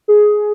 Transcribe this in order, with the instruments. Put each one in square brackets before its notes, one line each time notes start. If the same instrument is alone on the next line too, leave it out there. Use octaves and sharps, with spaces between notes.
[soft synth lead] G#4